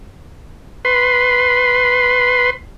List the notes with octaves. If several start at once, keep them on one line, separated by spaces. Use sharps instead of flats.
B4 C6